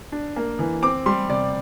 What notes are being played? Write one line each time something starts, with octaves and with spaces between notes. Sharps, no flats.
D4
A#3
E3
C4 D6
G3 C6
C3 D5